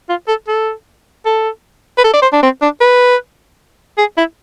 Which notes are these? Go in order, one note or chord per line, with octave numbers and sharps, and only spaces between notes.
F4
A4
A4
A4
B4
A4
D5
C5
D4
C4
D4
B4
G#4
E4